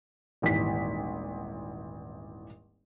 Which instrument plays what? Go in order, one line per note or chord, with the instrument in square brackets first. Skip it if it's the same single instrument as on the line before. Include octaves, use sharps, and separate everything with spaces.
[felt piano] D#1 G#1 E3 B6